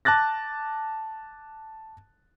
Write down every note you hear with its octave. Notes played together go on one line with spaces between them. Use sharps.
A5 D6 F#6 A6 A#6